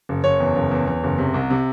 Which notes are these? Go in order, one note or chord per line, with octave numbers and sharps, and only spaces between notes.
F#1
F#1 C#5
E2
F#1
E2
E2
F#1
C3
C2
C3